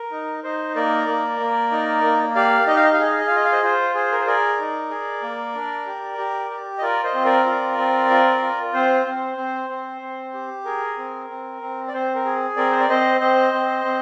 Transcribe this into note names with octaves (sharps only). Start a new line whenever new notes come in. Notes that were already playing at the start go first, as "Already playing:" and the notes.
Already playing: A#4
D#4
D#4 C5
A#3 A#4 D5
A#3
A#3
D#4
A#3
G4 D5 F5
D#4 D#5
F5
D#5
F5
G#4 D#5
F5
D#5
F5
F4 D#5
F5
C5 D#5
F4 C5
G#4 C5
A#4
C5
G#4 A#4 D5
D#4
G#4
A#3
D4
G4
G4
G4
D#5
F4 A#4 D5
C5 D#5
C4
A#4 D5
F4
C4
F4
F4
C4 C5
C4
C4
C4
C4
G4
G#4 A#4
C4
C4
C4
D5
C4 C5
A#4
G#4
C4 A#4 D5
C5
D5
C4 C5 D#5
C4 C5 D#5
C4
C4